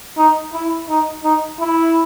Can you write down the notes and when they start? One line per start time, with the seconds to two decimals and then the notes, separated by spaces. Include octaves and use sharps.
0.18 D#4
0.53 E4
0.89 D#4
1.24 D#4
1.60 E4